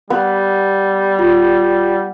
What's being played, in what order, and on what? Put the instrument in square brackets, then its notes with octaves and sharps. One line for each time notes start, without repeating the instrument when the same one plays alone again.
[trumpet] G3 [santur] B3
[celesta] F4